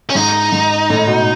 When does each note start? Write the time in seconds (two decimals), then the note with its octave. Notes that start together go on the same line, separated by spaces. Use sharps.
0.10 C#4
0.15 G#2 D#4
0.52 G#2
0.90 A2
1.08 B2